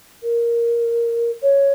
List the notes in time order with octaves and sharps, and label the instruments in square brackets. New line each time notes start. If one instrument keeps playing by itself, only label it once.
[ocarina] A#4
C#5